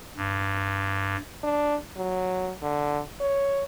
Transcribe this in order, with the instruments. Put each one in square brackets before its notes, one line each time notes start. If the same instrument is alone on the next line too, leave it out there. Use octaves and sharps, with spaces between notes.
[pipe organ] G2
[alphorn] D4
F#3
D3
C#5